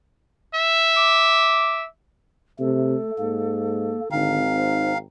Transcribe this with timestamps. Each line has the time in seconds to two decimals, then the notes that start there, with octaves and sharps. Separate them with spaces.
0.55 E5
0.97 D6
2.60 C3 A3 A4
3.19 G#2 A#3
4.12 G#1 D3 C4 D#4 F5
4.57 C5